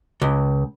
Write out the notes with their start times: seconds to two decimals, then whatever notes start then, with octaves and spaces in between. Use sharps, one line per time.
0.22 C#2